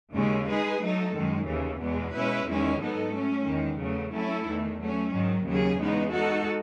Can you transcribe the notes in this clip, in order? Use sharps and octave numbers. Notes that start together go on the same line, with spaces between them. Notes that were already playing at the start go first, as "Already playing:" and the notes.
D#2 C#3 G#3 C#4
G#3 D#4 G#4 B4
F#3 A3 D#4 A4
F#2 D#3 G#3
D#2 C#3 E3
E2 B2 G#3 B3
B2 G#3 C#4 E4 B4
E2 D#3 G#3 C#4 E4
G#2 F#3 B3 D#4 A4
F#3 A3 C#4
E2 D#3 G#3
E2 C#3 F#3 A3
F#3 A3 C#4 E4 A4
E2 D#3 A3
F#3 A3 C#4
G#2 D#3 F#3
D#2 C#3 F#3 C#4 G#4
E2 C#3 G#3 B3 D#4
G#3 D#4 F#4 A4